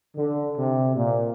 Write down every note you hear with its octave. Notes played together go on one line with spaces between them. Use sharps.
D3
C3
A#2